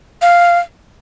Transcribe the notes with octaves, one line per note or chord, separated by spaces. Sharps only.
F5